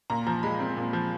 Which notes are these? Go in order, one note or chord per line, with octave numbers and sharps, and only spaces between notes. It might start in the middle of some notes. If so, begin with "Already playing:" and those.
A#2 A#5
F3 A#5
G#3 B5
C4
A#2
F3